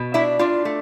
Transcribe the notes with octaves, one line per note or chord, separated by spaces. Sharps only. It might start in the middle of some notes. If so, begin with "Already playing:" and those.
Already playing: B2
D4 E4 E5
D4 F4
A3